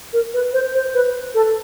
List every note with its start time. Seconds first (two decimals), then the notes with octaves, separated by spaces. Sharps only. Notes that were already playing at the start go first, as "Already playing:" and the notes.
0.13 A#4
0.34 B4
0.53 C5
0.75 C5
0.94 B4
1.35 A4